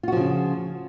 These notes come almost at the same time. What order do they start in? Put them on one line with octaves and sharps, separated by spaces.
F4 F#4 F3 C#3